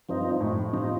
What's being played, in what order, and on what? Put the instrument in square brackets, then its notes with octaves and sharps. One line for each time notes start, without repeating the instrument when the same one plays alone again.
[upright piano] G2 [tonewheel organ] F3 C4 D#4
[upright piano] A2
[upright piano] C3 [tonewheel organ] F3 C4 D#4